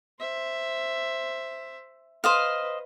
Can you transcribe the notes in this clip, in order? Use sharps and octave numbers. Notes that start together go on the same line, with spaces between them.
C5 E5
B4 C5 D#5 F5